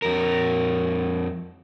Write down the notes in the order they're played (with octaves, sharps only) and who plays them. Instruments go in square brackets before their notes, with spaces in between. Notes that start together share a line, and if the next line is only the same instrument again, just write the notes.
[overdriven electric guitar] F2 A#4